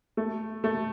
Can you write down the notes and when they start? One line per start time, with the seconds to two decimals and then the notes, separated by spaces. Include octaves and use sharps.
0.17 A3
0.64 A3